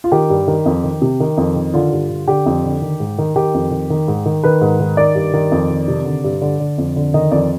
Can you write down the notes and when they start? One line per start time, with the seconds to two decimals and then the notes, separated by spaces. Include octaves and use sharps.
0.04 F4
0.12 D#3 G4
0.30 G2
0.48 D#3
0.66 F2
0.84 D#3
1.02 C3
1.20 D#3
1.37 F2
1.56 D#3
1.74 D3 F4
1.92 G2
2.10 D3
2.28 D3 G4
2.46 F2
2.64 D3
2.82 D#3
3.00 G#2
3.18 D#3
3.36 D#3 G4
3.54 F2
3.71 D#3
3.90 D#3
4.08 G#2
4.26 D#3
4.44 D#3 B4
4.61 G#2
4.80 D#3
4.97 D#3 D5
5.15 G2
5.34 D#3
5.52 F2
5.70 D#3
5.88 C3
6.05 D3
6.24 G2
6.42 D3
6.60 D3
6.78 F2
6.96 D3
7.14 D#3 D#5
7.32 F2 D5